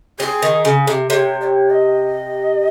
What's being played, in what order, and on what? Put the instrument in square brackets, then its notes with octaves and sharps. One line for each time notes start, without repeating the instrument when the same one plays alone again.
[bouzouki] C4 [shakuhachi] G#4
[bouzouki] D#3
C#3
C3
[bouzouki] C3 [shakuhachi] C#5
[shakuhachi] D#5
C#5
D#5